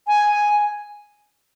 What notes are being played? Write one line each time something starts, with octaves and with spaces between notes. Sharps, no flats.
G#5